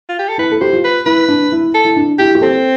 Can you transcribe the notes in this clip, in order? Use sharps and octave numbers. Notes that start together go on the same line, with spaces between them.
F4
G4
A4
E4 B4
A4
G4 C5
F4
B4
E4 B4
D4
E4
A4
E4
D4
E4 G4
G4
C4 A4